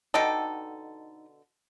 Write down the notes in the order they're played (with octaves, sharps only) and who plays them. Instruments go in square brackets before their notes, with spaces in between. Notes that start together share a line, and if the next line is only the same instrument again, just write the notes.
[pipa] B2 D3 A4 [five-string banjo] D#4 D#5 G5